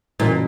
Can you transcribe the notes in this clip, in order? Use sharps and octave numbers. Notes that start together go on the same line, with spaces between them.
F#1 F#2 A#2 E3